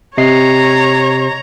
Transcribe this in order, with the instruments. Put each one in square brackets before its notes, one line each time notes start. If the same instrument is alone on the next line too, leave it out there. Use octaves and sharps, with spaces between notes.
[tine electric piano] C3 D#5 C7 [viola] C#5 A#5